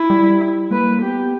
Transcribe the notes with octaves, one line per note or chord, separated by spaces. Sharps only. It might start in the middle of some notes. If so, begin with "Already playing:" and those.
Already playing: E4
G3
A#3 B4
B3 G4